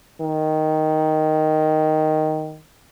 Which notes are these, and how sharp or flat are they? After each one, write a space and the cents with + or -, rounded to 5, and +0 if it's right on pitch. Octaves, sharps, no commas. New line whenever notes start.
D#3 +0